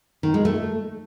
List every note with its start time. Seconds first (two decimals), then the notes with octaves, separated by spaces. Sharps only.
0.23 D#3
0.34 G#3
0.45 A3